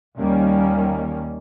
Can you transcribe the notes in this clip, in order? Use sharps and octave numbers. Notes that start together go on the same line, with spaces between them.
D#2 D#3 G3 A#3 C#4